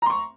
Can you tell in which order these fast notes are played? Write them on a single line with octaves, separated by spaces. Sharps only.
A#5 C6 C#6